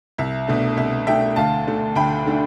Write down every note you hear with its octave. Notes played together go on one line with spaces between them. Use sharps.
C2 E5
B2 A3 D4
C2 E5
B2 A3 D4 E5 G5
D2 F5 A5
D3 A3 D4
D2 G5 B5
D3 A3 D4